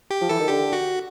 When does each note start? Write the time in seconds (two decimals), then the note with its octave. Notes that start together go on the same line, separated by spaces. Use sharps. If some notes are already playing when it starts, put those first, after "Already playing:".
0.11 G4
0.21 F3
0.29 E3 A4
0.40 D#3
0.48 D3 G4
0.73 F#4